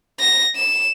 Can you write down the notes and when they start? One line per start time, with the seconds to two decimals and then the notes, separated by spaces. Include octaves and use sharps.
0.20 A#6
0.56 E7